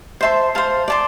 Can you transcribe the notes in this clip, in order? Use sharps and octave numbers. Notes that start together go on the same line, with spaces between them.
C5 E5 A5 C6
C5 F5 A5
D5 A5 C6